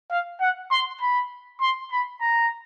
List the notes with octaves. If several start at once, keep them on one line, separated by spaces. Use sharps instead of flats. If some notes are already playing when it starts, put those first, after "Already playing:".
F5
F#5
C6
B5
C6
B5
A#5